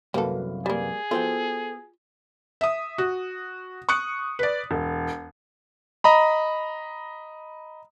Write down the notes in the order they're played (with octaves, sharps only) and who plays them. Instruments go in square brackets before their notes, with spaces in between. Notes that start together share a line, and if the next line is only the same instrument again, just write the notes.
[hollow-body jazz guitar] C2 F#2 [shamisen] A#3 A4 [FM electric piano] F#4 B4 F5
[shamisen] G3 A#3 [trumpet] G#4
[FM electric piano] B3 F#4 [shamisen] F4 [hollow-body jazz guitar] A4 C5 G5
[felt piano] E5 D#6
F#4
C#6 D#6 F#6 C#7
B4 D5
E1
[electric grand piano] D#5 A#5 B5